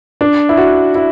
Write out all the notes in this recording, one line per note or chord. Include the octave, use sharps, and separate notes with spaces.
D4
E4
F#4
E4